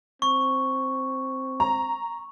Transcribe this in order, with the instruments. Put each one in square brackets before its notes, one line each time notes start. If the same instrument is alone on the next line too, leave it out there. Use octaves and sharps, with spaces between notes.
[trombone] C4 [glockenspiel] C#6
[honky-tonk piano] A#5